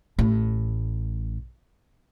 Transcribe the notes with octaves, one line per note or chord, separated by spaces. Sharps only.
A1 A2